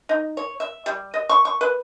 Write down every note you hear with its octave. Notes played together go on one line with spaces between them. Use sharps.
D#4
C#5
E5
G3
D#5
C#6
C#6
B4